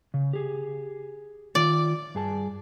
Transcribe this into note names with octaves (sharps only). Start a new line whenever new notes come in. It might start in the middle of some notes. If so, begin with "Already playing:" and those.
C#3
G4 G#4
D#3 F4 D5
G2 G#4 A5